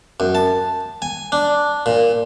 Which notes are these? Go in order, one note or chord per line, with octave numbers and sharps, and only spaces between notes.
F#2
A5
G#5
D4
A#2